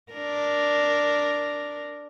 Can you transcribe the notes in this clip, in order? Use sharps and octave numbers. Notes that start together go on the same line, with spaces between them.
D4 A#4